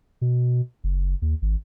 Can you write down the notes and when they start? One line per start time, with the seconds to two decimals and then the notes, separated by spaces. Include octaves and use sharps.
0.21 B2
0.84 F#1
1.22 D#2
1.42 G#1